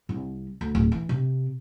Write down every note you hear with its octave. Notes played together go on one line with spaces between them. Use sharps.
C2
D2
D1
E3
C3